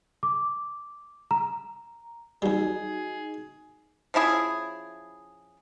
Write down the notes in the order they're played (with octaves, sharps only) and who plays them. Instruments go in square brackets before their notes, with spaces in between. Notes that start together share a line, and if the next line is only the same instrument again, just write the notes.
[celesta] D6
A#5
[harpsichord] D#2 G3 [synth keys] D#4 F#4 [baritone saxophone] G#4
[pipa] F3 C#4 E4 G#4